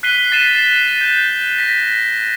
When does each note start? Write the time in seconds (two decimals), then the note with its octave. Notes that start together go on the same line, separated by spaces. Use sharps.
0.03 F#6 B6 C7 D#7 G7
0.32 A6 B6 C7 D#7 E7
0.55 A6
1.01 G6
1.58 A#6 B6